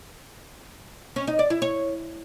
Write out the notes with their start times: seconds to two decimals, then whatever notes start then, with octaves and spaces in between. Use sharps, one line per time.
1.16 C#4
1.27 D#4
1.39 D5
1.50 E4
1.62 C#5